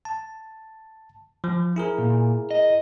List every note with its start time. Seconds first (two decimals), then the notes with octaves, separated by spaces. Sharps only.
0.05 A5
1.44 F3
1.76 E4 G#4 A#4
1.98 A#2
2.51 D#5